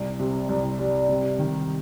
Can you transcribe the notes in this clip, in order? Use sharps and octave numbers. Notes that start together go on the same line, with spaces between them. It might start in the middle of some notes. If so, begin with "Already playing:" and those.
Already playing: C2
C3
C2
G3
C3
D#3